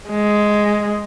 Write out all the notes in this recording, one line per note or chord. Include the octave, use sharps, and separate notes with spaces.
G#3